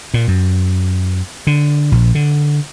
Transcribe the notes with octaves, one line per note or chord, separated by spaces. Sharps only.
A#2
F#2
D3
A#1
D3